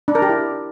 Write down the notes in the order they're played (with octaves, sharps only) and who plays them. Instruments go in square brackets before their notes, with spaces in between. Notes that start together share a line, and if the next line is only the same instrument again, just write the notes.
[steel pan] D4
A#4
G4
E4